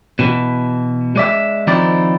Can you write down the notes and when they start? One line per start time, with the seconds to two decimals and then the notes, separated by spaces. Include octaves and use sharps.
0.19 B2 E3
1.16 G#3 D5 E5
1.67 D#3 F3 C4 D#4 E4 D5